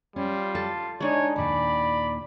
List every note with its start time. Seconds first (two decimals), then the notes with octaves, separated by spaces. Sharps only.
0.16 G3 C#4 F4
0.55 A4 A5
1.00 G#3 D4 D#4 C#5
1.36 D#2 A#2 D#3 D5 B5